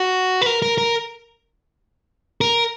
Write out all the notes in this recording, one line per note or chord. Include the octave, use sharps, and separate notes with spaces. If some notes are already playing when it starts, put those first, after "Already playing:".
Already playing: F#4
B4
A#4
A#4
A#4
A#4